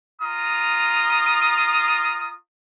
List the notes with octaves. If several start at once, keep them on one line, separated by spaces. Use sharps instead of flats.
F4 A#5 D#6